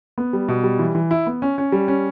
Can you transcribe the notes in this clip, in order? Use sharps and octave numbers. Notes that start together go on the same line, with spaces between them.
B3
G3
B2
G3
E3
E3
E4
B3
C#4
C#4
G3
C#4